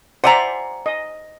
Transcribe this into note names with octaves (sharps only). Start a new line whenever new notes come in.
C5 D5 E5 F#5 G#5 A#5
D#5